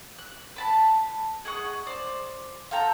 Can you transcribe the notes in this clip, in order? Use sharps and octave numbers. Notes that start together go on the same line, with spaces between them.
F#6
B4 A5 B5
G#4 D#5 F#5 C#6
C5 D5
F4 A4 G5 A#5